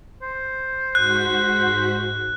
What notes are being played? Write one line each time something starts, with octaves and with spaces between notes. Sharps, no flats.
C5
G#2 F#4 F#6 B6